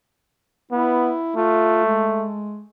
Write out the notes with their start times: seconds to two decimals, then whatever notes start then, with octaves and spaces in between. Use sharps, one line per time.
0.71 B3 E4
1.36 A3 F4
1.85 G#3